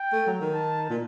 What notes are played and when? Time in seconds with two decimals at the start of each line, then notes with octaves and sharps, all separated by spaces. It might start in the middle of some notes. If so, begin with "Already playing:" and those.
Already playing: G5
0.12 A3
0.26 F#3
0.41 D#3
0.54 A5
0.89 A#2